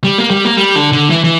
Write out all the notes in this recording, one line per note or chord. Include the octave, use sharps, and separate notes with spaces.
G3
A#3
G3
A#3
G3
D3
D3
E3
E3